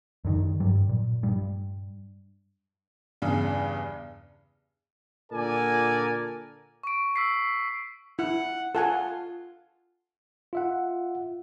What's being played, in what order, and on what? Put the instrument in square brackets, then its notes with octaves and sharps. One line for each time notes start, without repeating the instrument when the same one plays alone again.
[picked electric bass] F#2 D3 D#3
G2 F#3 G3
A#2
G2 G3
[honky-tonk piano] E2 G2 C#3
[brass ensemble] A#2 D3 A4 A#4 D5 G#5
[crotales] C#6 D7
E6 B6 C7
[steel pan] E4 [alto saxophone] F#5
[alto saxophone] F4 [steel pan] A4 F#5 G#5
[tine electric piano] F4 E5 F#5